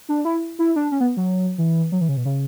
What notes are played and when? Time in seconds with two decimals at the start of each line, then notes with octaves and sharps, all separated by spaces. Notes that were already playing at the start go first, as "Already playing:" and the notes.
0.09 D4
0.25 E4
0.59 E4
0.76 D4
0.92 C#4
1.00 B3
1.17 F#3
1.58 E3
1.92 F#3
2.01 E3
2.09 C#3
2.17 B2
2.25 C#3